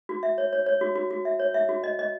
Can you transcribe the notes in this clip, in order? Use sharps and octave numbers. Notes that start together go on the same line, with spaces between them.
F#4
E5
C#5
C#5
C#5
F#4
F#4
F#4
E5
C#5
E5
F#4
D#5
D#5